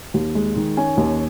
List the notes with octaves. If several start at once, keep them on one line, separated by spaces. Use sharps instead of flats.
D#2
G#3
D#3
C#4 G#5
D#2